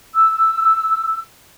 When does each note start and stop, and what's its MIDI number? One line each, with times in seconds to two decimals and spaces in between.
0.15 1.20 88